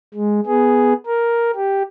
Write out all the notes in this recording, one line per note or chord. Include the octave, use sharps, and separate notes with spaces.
G#3
B3 G#4
A#4
G4